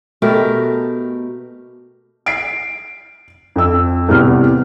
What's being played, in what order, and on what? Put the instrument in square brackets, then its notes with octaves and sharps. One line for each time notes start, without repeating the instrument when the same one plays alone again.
[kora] B2 A3 G4 A#4
[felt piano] C7 D7
F2 E6
E2 A2 C3 G3 B3 F6